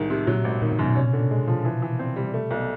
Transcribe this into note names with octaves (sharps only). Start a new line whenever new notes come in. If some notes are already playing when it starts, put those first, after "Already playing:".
Already playing: C2 A2 D#3 G#3
C3
A#2 F#3
G#1
A#2 D#3
A#2
F#2
B2
C3 C#4
D3
G#3
F3
E3
E3
C4
G3
A3
B1